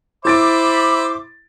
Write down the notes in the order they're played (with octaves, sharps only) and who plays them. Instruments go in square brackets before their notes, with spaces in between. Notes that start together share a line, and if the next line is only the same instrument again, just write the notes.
[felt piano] E4 A6 D7 [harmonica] C5 E5 [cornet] B5 [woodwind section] D6